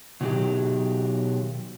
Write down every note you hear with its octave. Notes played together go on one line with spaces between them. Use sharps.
B2 D#3 F#3 G4 G#4